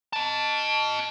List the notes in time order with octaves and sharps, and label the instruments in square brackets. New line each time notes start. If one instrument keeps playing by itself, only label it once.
[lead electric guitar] D#5 A5